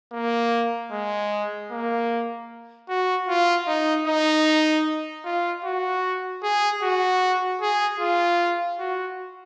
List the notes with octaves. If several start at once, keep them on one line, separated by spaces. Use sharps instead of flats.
A#3
G#3
A#3
F#4
F4
D#4
D#4
F4
F#4
G#4
F#4
G#4
F4
F#4